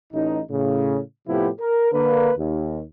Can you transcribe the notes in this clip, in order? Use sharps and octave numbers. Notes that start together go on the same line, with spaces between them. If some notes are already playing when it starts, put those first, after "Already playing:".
A1 D#4
A2 C#3
A2 C3 F3 B3 E4 G4
A#4
D3 A#3 B4
D#2